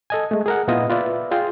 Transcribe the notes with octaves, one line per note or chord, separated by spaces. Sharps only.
A4 D#5 G#5
G#3 A3
G#4 A#4 F#5
A#2 B3 E4 F4 D#5 D#6
F4 B4 D5 E5
F4 G#4 G5 C6